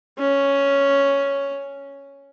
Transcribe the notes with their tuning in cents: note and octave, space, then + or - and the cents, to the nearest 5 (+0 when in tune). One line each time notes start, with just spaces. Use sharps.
C#4 +5